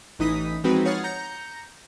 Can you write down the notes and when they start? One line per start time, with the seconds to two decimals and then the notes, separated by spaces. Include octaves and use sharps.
0.19 A1 E3 D#4 D#6 B6 D#7
0.64 F3 G#3 C4 D#4 F#4 B4
0.85 C#5 F#5 D#6 F6 A6 C7
1.04 A#5 G6 A#6 C#7